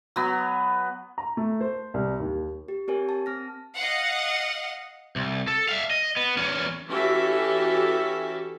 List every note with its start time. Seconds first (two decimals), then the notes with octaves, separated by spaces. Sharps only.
0.16 F#3 B3
1.18 A#5
1.37 A3
1.61 C5
1.94 C2
2.20 D#2
2.68 G4
2.88 C4 G4 A#4 C#5 G#5
3.09 A5
3.26 C4 F6 A#6
3.76 D#5 F5 F#5
5.16 C2
5.48 A4
5.69 E5 F5
5.91 D#5
6.17 B3
6.37 E2 C#4
6.88 E3 C#4 F#4 G4 A4 E5